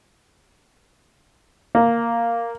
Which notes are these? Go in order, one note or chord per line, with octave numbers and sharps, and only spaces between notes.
A#3